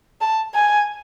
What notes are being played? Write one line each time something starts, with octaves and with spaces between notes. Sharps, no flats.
A5
G#5